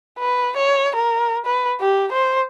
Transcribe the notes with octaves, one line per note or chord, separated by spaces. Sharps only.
B4
C#5
A#4
B4
G4
C5